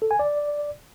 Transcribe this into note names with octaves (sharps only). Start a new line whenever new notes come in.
A4
G#5
D5